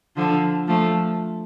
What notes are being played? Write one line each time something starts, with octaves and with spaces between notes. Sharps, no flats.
D3 F3
F3 A3